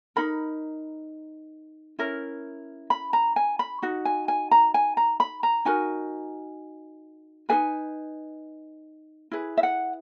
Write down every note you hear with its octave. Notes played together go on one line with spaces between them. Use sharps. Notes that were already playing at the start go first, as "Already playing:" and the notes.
D#4 A#4 B5
C#4 E4 A#4
B5
A#5
G#5
B5
D#4 F#4
G#5
G#5
A#5
G#5
A#5
B5
A#5
D#4 F#4 A#4 G#5
D#4 G#4 B4 G#5
E4 G#4 B4
E5
F#5